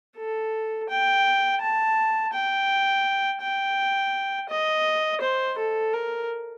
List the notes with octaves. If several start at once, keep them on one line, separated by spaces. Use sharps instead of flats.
A4
G5
A5
G5
G5
D#5
C5
A4
A#4